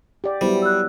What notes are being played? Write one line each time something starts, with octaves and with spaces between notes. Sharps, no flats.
G4 D5
F#3 G3 B3 E4 C5
E6 F#6